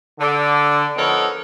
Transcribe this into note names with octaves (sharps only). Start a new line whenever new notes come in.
D3
F3 B3 D#4 A4 A#4 C#5